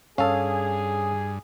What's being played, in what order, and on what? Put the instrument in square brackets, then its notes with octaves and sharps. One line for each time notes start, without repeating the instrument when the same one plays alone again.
[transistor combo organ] G2 [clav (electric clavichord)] C#4 A4 [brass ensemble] G#4 [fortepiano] F5